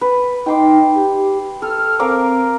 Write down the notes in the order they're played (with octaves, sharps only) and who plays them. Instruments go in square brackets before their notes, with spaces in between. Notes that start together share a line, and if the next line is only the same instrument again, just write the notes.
[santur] B4
[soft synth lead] D#4 [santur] G5 C6 D6
[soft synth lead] G4
[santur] A4 [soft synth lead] F6
[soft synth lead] C4 [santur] A#4 F5 D6